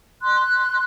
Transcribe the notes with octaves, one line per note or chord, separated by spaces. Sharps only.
C6 F#6